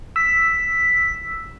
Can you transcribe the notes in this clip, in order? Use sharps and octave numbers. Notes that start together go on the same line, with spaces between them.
E6 B6